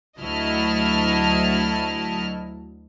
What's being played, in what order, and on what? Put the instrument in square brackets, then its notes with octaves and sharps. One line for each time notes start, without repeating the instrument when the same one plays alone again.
[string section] D2 F#3 E4 D#5 A5 F6